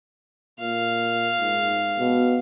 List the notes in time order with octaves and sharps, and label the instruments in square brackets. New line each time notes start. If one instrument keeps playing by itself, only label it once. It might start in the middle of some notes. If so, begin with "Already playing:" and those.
[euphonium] A#2 [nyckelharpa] F5
[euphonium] G#2
B2